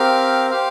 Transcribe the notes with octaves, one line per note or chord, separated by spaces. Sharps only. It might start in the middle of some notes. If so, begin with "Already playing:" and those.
Already playing: C4 G4 A#4 F5
G4 C5 F5